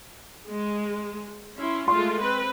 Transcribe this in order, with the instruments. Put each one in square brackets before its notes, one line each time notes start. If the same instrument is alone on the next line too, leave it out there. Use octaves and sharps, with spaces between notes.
[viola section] G#3
C#4 E4 C6
[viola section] G#3 A3 F4 [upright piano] C6
[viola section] C4 B4